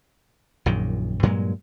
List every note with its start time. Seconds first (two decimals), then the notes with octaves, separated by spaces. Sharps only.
0.66 A#1 F#2 A#2 D#3
1.23 G2 A#2 F#3 G#3